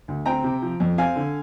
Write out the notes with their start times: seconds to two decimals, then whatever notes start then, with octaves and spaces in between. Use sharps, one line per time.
0.08 D2
0.26 C4 G5 A#5
0.44 C3
0.62 F3
0.80 F2
0.98 C4 F5 G#5
1.16 D3